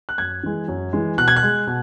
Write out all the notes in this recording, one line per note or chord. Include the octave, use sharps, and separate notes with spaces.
F#6
F#2 G#6
E3 G#3
F#2
E3 G#3
B2 F#6
G#6
F#6
G#3
B2